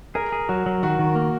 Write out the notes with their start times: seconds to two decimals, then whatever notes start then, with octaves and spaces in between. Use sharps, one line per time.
0.15 G#4 A#4
0.32 G#4
0.49 F#3 F#4
0.66 F#3
0.83 D#3 F#4
0.99 D#3
1.15 A#3